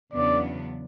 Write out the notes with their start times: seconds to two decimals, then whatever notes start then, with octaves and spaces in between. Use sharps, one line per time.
0.13 E2 C#3 F#3 B3 D4 D5